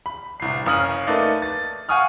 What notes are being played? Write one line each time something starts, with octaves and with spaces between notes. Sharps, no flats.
B5
D1 C2 C7
F#1 C#4 F5 D#6 F6 F#7
A3 A#3 D#4 A4 B4 D5
A6
F5 F#5 G#5 C#6 D#6 F6